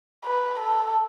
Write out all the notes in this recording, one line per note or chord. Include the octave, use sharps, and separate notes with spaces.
B4
A4